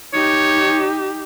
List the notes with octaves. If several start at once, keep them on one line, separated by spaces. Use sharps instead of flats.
D#4 G4 C#5